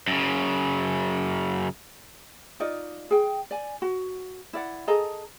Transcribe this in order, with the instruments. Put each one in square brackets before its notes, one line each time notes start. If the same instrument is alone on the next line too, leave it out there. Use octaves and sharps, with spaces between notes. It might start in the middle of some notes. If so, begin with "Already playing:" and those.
[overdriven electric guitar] F#2 C#3
[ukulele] D#4 F4 D5 D#5
G#4 G5
D5 G#5
F#4
E4 D5 F#5
G#4 A4 D#5 A#5